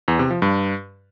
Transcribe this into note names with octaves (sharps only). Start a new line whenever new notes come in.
E2
C3
F3
G2